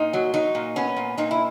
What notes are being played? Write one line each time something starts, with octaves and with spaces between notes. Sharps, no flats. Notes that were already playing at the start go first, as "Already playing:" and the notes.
Already playing: A#2 D#4
F#3
F#3 D#4
A#2
B3 C#4
A#2
A#2 D#4
E4